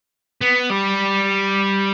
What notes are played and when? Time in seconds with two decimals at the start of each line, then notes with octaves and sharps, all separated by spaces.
0.41 B3
0.70 G3